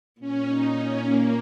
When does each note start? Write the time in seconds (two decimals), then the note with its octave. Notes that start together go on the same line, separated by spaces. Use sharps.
0.20 A#2 C#4
0.48 D#4
0.77 C#4
1.05 A#3